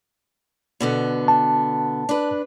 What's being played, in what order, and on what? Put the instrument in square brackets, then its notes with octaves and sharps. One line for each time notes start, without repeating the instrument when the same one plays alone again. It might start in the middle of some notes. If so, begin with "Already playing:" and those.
[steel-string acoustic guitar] B2 D3 B3
[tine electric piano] A5
[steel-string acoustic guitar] D4 B4